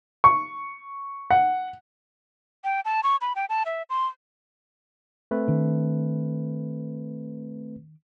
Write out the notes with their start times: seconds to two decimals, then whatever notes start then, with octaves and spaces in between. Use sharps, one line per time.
0.24 C#6
1.31 F#5
2.64 G5
2.85 A5
3.04 C#6
3.21 B5
3.36 G5
3.49 A5
3.66 E5
3.90 C6
5.31 A3 C4 B4
5.48 D#3 D4